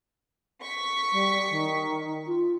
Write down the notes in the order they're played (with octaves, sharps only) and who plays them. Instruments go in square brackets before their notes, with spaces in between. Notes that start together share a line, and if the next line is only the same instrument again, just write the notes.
[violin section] C#6 B6
[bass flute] G3
D#3
F4